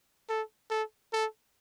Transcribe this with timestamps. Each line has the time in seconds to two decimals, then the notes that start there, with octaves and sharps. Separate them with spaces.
0.30 A4
0.71 A4
1.13 A4